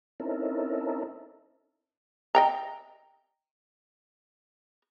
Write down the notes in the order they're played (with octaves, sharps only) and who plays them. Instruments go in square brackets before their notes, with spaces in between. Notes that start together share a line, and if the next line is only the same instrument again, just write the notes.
[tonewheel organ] C4 C#4 D#4 E4 A4 A#4
[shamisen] D#5 G5 A#5